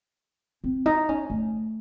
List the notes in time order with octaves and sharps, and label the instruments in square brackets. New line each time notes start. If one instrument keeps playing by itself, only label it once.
[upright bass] C4
D#4
C#4
A3